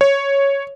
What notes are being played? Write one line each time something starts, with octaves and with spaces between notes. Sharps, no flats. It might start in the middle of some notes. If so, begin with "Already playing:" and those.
C#5